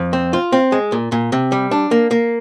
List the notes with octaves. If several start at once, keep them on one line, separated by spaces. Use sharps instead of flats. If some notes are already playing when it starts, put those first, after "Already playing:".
Already playing: F2
C4
F4
C4
G#3
A#2
A#2
C3
G3
D4
A#3
A#3